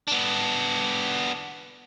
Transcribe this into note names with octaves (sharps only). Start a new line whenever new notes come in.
B3 D4